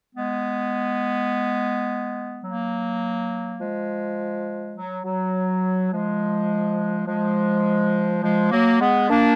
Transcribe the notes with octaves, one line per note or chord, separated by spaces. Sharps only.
G#3 B3
F#3 A#3
F3 G#3
F#3
F#3
F3 G#3
F3 G#3
F3 G#3
F#3 A#3
G#3 B3
A#3 D4